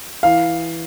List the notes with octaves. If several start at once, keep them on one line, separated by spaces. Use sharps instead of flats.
E3 F5